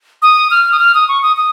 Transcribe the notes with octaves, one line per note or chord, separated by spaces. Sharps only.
D#6
F6
D#6
F6
D#6
C#6
D#6
D#6